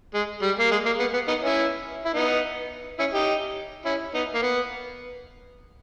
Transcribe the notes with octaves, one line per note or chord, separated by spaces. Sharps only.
G#3
G3
A#3
G#3
A#3
B3
B3
B3 D#4
C#4 E4
E4
B3 D#4
C#4 E4
D#4 G4
C#4 E4
B3 D#4
A#3
B3